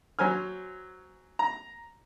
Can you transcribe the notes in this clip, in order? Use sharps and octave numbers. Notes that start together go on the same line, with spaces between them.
F#3 C5 G#5 F6
A#5